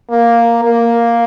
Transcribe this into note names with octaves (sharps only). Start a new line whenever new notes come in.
A#3
A#3